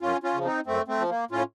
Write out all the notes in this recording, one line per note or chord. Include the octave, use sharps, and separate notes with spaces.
F#2 C#4 F4
C#4 F4
C#3 F3
C4 D#4
F#2 A3 C4
A3 C4
F3
A#3
A2 C#4 F4